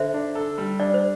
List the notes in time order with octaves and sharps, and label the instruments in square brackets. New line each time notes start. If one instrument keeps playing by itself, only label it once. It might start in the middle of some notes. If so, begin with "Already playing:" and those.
Already playing: [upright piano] D3 [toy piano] C5 E5
[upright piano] D4
A4
G3
[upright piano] D4 [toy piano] D5
[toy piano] C5